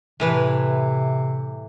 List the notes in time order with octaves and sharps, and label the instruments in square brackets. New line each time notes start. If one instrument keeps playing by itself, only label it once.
[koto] A2 E3 B4 [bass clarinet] C3